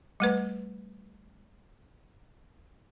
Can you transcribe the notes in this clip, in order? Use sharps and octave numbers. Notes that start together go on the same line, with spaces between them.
G3 A3 B4